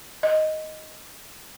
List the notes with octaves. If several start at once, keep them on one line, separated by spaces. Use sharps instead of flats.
D#5